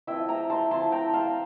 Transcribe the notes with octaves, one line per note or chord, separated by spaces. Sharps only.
F3 C4 E4 E5 G5
G5 A#5
A5 C6
F3 C4 E4 A5 C6
G5 A#5
F5 A5